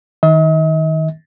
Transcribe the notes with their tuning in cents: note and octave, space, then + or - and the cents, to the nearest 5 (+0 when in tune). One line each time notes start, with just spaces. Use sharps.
D#3 +15 D#5 +45